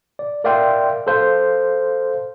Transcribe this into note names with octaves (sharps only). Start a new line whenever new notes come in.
D5
A#4 D5 E5 F5 G5 C6
A4 C5 F5